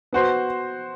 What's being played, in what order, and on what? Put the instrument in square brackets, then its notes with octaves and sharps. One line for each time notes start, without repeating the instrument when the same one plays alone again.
[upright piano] B3 F#4 C5